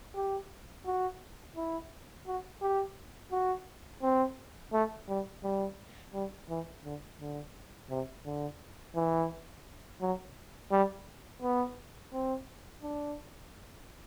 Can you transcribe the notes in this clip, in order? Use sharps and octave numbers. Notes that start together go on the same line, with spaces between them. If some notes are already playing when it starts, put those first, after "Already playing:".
G4
F#4
E4
F#4
G4
F#4
C4
A3
G3
G3
G3
E3
D3
D3
C3
D3
E3
F#3
G3
B3
C4
D4